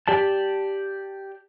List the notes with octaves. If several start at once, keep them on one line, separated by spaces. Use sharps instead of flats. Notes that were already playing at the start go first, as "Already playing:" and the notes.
G4 D5 A5